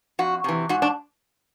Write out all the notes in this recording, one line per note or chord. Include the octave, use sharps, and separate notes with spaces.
F2 F#4
C3 E3
G#2 F#4
D4